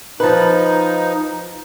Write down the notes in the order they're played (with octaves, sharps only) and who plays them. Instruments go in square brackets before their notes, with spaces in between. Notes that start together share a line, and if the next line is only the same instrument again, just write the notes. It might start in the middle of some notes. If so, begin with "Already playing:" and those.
[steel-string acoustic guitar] F3 B4 [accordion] D#4